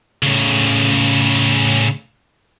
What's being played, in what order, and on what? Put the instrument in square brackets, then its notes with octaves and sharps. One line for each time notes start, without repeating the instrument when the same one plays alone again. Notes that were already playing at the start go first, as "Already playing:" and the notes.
[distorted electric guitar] A2 C#3